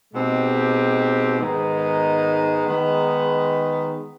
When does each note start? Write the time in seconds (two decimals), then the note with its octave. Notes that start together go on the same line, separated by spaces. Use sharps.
0.13 B2 G#3 C4 D#4 G4
1.40 G#2 D#3 G#3 B3 D#4
2.67 D#3 G#3 B3 D#4